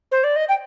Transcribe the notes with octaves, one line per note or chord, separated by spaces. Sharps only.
C5
D5
D#5
G5